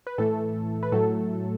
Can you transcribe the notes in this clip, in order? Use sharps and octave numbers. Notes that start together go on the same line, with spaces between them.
B4
A2 E3 A3 A4
B4
A2 F#3 A3 A4